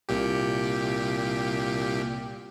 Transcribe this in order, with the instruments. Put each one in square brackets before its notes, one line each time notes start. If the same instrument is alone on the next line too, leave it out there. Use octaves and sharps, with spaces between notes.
[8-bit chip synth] C2 A#2 G4